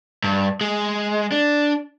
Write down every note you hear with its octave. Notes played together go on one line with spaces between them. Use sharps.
G2
G#3
D4